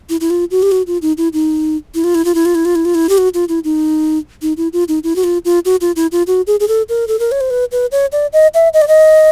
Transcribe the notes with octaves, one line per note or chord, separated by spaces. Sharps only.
E4
E4
F4
F#4
G4
F#4
F4
D#4
E4
D#4
E4
F4
E4
F4
E4
F4
E4
F4
E4
F4
E4
G4
F#4
F4
E4
D#4
D#4
E4
F4
D#4
E4
F#4
F4
F4
F#4
F4
E4
F4
F#4
G#4
G#4
A4
A#4
A4
A#4
C#5
C5
B4
B4
C#5
D5
D#5
E5
D#5
D5
D#5